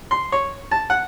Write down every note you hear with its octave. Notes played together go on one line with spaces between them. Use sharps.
C6
C#5
A5
F#5